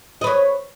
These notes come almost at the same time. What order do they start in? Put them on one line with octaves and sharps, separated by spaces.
D#5 B4 C#5